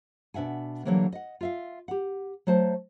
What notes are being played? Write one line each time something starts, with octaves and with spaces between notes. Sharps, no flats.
B2 D4 E5 F#5 G#5
D3 E3 F#3 G3 A#3
D#5 F#5
F4 E5 F5
G4 F#5
F#3 A3 C5 A5